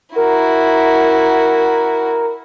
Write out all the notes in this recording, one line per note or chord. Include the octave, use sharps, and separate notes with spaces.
E4 F#4 A#4